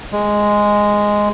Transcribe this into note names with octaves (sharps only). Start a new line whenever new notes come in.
G#3